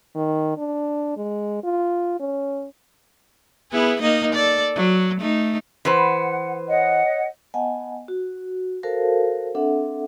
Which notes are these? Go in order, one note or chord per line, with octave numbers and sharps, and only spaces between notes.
D#3
D4
G#3
F4
C#4
B3 E4 G#4
A#3 D#4 D#5
A4 D5
F#3
A3 D#4
E3 B4 C5 F#5
C#5 D#5 F#5
B3 D#5 F#5 G#5 A5
F#4
F#4 A4 A#4 C5 F5 A5
C4 D4 A4 E5 F#5